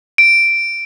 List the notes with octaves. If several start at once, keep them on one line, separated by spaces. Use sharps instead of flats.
D7